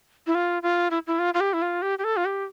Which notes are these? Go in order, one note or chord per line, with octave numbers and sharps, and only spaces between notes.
E4
F4
F4
E4
E4
F4
F4
G4
E4
F4
G4
G4
A4
F4
G4